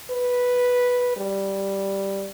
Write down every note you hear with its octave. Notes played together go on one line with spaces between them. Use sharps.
B4
G3